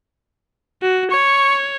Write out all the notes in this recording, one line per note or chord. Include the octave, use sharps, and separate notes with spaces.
F#4
C#5 C#6